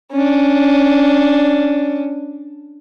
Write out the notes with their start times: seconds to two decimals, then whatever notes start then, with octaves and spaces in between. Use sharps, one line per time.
0.12 C#4 D4